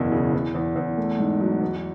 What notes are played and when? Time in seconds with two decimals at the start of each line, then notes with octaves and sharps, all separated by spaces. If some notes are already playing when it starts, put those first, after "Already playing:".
Already playing: F#1 E2 B2
0.12 C#3
0.33 E2
0.55 E2
0.76 E2
0.97 A3
1.19 G#2
1.40 F#3
1.61 E2